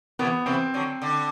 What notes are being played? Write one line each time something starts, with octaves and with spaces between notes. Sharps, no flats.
C3 E3 B3
C3 E3 C4
D3 F#3
D3